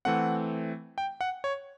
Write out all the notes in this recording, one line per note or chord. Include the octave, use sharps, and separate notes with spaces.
E3 A3 C4 F#5
G5
F#5
C#5